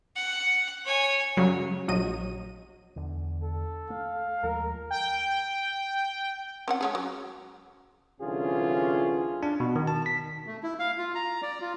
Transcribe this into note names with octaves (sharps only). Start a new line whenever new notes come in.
F#5
C#5 G#5
F#2 C#3 F#3 G3
A#1 F#3 D#5 D#7
E2 D3
A4
A3 F5
D#2 F3 G#3 A#4
G5
C4 C#4 F#5
G#3 C#4 G#4
F#3
C2 D3 E3 C#4 F4 G#4
D4
B2
D#3
A5
B6
A3
E4
F5
F4
A#5
D5
F4